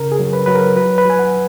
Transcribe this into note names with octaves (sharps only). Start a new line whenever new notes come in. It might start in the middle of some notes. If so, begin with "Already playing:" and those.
Already playing: C#3 A#4
G#4
F#3
B4
F#3 B4
A#4
F#3 B4
B4
F#3 G#5
F#5